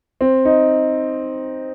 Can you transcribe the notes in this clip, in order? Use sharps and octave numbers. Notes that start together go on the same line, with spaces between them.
C4
D#4